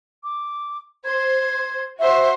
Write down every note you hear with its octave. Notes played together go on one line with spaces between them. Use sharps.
D6
C5 G#6
F#4 C5 E5